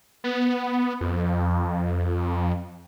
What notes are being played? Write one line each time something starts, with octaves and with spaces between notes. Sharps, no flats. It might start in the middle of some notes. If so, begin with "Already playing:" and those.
B3
F2